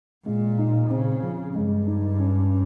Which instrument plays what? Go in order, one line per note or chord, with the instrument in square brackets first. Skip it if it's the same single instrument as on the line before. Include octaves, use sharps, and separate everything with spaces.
[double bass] A#2 [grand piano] G#3
[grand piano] D#4
[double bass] C#3 [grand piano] C4
[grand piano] F3
[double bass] G2 [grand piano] G#3
[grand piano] D#4
C#4